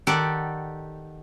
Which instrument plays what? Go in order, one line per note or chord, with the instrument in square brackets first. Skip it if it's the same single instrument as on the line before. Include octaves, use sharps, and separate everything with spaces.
[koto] D#3 G4 A4 D5 F#5